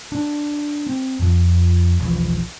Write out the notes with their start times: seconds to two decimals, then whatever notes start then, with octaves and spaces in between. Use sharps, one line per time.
0.12 D4
0.87 C4
1.19 F2 F3
2.00 E1 B1 E3 F3